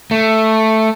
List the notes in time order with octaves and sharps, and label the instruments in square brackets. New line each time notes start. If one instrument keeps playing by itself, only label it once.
[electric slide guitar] A3